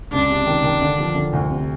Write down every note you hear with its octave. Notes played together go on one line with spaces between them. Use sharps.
C#2 D4
C3
D#3
D#3
D3
F3
D3
D2
C3